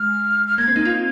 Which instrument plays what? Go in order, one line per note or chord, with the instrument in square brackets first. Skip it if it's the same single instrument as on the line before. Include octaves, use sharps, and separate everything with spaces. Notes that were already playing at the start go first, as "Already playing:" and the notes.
Already playing: [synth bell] G#3 [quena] F6
[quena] F6
[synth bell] A#3 [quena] G#6
[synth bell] C4
A#3 D#4
C4 F4